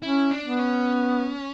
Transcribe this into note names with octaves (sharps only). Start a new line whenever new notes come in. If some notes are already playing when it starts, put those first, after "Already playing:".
C#4 E4
D4
B3
C#4